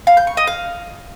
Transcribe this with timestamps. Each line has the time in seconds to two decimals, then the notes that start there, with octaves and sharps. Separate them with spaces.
0.07 F5
0.17 G6
0.27 C#6
0.37 D#5
0.47 F5